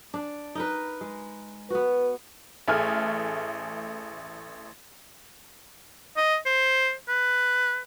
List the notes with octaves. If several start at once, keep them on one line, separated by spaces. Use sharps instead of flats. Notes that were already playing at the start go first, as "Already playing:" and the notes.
D4
D#4 A#4 B4
G#3
B3 F#4 B4
A1 A3 G#4 G#5 F6
D#5
C5
B4